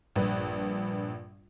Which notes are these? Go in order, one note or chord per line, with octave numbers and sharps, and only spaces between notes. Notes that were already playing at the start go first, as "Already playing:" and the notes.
A#1 G2 B4